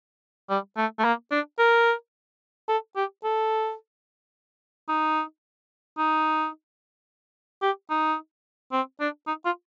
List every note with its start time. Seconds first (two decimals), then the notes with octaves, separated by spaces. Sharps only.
0.49 G3
0.77 A3
0.99 A3
1.04 A#3
1.31 D4
1.59 A#4
2.68 A4
2.96 G4
3.24 A4
4.88 D#4
5.98 D#4
7.62 G4
7.90 D#4
8.72 C4
9.00 D4
9.27 D#4
9.45 F4